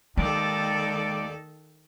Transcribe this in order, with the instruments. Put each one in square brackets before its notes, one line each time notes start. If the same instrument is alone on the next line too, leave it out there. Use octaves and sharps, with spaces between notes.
[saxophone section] D#2 G4 D5 [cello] D#3 A4 [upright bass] G#3